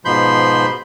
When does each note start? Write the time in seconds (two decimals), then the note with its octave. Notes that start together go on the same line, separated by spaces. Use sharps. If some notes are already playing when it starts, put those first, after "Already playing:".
0.05 G#2 B2 F3 B5 C6 G6